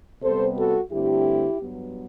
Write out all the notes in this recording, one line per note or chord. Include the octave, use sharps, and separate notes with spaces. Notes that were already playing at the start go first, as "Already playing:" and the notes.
C3 G3 B3 A4 C5
F#4 A4
G2 D3 A3 C4 E4 G4
G2 F#3 B3